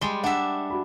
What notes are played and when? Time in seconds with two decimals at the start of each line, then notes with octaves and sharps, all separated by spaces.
0.01 G3 G#3 C6 G7
0.24 D4 E5 F#5
0.70 F#4 B5